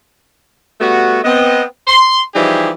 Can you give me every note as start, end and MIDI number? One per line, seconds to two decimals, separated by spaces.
0.81 1.18 55
0.81 1.18 57
0.81 1.18 59
0.81 1.18 66
1.24 1.63 59
1.24 1.63 60
1.24 1.63 75
1.87 2.21 84
2.35 2.71 52
2.35 2.71 53
2.35 2.71 55
2.35 2.71 63
2.35 2.71 67
2.35 2.71 68